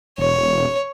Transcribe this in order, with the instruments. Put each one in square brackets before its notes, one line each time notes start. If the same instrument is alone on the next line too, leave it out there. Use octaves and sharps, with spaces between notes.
[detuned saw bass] E1 [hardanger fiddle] C#5